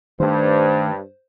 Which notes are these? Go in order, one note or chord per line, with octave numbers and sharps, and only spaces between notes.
G2 D#3 A3 C5